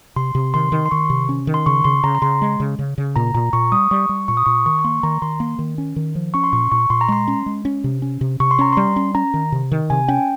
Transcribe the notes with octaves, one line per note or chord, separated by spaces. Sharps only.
C3 C6
C3
D#3 C6
D#3
C6
D#3 C#6
C3
C#4
D#3
C6
C#3 C#6
C#3 C6
C#3 A#5
A#5
C#3 C6
G#3
C#3
C#3
C#3
A#2 A#5
A#2 A#5
A#2 C#6
G3 D#6
G3 C#6
G3
A#2 C#6
D#6
A#2 C#6
D#3 C#6
C#6
A#3 C6
D#3 A#5
D#3 C6
A#3
D#3
C#4
D#3
F3
C#4 C#6
C6
A#2 C#6
A#2 C#6
A#2 C6
A#5
G#3 C6
C#4
G#3
C#4
C3
C#4
C3
C3 C#6
C6
C#4 A#5
G3 C6
C#4
C#4 A#5
D#3
C3
D#3
C3 G#5
C#4 G5